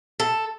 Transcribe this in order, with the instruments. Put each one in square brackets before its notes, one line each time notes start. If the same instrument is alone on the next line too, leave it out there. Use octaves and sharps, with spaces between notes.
[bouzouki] A4